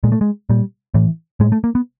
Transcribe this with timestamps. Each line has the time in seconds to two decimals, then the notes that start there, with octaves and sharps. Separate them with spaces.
0.04 A#2 G#3
0.12 A3
0.21 G#3
0.50 A#2 G3
0.94 A2 E3
1.40 A2 G#3
1.52 A3
1.64 A#3
1.75 B3